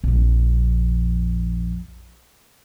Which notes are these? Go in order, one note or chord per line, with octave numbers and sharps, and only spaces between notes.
A#1 F2